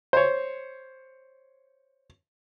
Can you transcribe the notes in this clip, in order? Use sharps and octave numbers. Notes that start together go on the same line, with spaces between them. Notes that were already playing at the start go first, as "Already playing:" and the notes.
C5 C#5